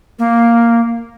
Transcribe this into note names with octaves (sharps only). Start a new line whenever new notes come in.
A#3